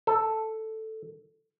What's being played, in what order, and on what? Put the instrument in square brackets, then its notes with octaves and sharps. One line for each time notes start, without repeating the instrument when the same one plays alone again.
[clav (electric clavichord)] A4